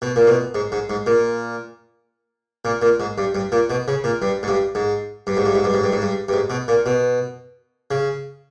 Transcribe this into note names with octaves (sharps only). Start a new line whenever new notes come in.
B2
A#2
B2
G#2
G#2
G#2
A#2
A#2
A#2
G#2
G2
G2
A#2
B2
C#3
A#2
G2
G#2
G2
G#2
G2
G#2
G2
G#2
G2
G#2
G2
G#2
G2
G2
G#2
B2
A#2
B2
C#3